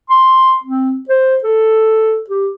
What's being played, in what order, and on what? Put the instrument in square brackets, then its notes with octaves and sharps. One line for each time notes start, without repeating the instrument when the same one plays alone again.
[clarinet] C6
C4
C5
A4
G4